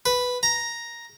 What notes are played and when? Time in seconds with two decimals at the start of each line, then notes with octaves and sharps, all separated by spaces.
0.06 B4
0.43 A#5